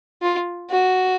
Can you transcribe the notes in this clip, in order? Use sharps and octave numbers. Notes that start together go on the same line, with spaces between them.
F4
F#4